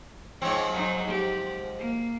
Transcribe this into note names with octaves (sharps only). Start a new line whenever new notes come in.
G#2 F3 C4 C#5
F#3 D#4
G4
A#3